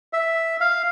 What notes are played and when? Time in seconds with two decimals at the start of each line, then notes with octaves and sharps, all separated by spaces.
0.13 E5
0.61 F5